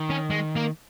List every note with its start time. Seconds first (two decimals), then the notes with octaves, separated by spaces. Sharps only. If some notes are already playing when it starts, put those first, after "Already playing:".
Already playing: D#3
0.10 C#4
0.30 G#3
0.56 A#3